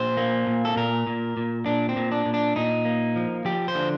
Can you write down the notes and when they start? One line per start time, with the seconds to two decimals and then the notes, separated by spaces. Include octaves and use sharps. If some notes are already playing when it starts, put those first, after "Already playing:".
Already playing: A#2 C5
0.17 A#3
0.47 A#2
0.65 A4
0.76 A#2 A#4
1.07 A#2
1.37 A#2
1.66 A#2 D4
1.89 C4
1.96 A#2
2.12 D4
2.26 A#2
2.34 D4
2.56 A#2 D#4
2.85 A#3
3.16 F3
3.45 F3 G4
3.68 C5
3.75 D3